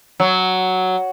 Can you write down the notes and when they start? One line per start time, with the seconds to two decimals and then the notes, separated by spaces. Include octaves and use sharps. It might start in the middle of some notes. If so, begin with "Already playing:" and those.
0.20 F#3